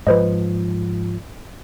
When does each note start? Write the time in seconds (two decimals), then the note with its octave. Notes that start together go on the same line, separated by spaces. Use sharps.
0.07 G#2 F3 B4 C5 D#5